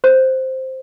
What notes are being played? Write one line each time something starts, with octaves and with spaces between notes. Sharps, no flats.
C5